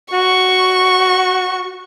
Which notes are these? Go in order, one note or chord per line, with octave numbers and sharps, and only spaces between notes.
F#4 C#6